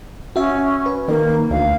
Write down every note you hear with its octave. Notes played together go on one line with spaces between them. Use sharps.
C#4 F#4 E5
B4
D#3 A#3
D2 F5